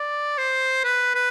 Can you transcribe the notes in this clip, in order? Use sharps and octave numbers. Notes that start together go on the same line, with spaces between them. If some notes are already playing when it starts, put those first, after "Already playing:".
Already playing: D5
C5
B4
B4